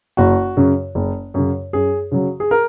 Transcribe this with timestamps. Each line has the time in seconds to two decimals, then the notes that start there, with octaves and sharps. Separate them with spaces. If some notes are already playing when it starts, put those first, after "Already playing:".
0.17 F#1 F#4
0.57 F#2 C#3
0.95 F#1
1.34 F#2 C#3
1.73 F#2 G#4
2.12 C#3 F#3
2.40 G#4
2.51 A#4